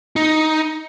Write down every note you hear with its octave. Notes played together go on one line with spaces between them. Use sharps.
D#4